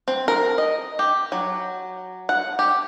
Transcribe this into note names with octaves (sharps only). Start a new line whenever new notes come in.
C4
A#4
D#5
G4
F#3
F#5
G4